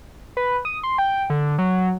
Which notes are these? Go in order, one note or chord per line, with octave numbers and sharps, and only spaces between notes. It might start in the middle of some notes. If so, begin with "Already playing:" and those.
B4
D#6
C6
G5
D3
F#3